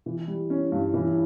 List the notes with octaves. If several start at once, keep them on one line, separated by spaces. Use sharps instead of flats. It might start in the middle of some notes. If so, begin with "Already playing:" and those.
E3
G3
C#4
G2
E3